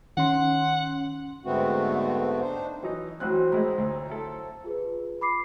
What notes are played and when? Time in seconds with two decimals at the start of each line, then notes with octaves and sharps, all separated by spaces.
0.17 D#3 C#4 F#5 C6
1.45 G#2 D3 A3 B3 C4 F#4
2.41 D4 D#4 C5
2.83 E3 F#3 D#4
3.20 A1 F#3 C4 F5 F#6
3.52 A2 G#3 D#4 A#5
3.78 D2
4.10 E4 A4
4.64 F4 G#4 B4
5.21 B5 D6 C7